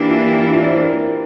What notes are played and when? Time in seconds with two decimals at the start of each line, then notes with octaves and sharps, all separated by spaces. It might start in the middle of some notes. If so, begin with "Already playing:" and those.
Already playing: E3 A#3 D4 G4
0.09 F4
0.23 G4
0.38 E4
0.52 F4
0.62 D5
0.67 C5
0.82 A#4